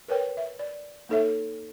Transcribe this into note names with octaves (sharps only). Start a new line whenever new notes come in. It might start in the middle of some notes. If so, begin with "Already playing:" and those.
A#4 B4 C#5 G5
E5
D5
A#3 D#4 A4 C#5 E5